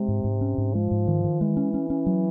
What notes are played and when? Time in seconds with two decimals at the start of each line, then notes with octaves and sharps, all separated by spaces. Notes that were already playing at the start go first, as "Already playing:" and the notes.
Already playing: C3 G#3
0.08 G#2
0.24 G#2
0.41 C#4
0.58 G#2
0.74 F3 G#3
0.91 G#2
1.07 D#3
1.24 D#3
1.41 E3 G#3
1.57 C#4
1.74 C#4
1.90 C#4
2.06 F#3